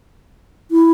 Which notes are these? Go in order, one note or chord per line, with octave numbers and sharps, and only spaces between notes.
E4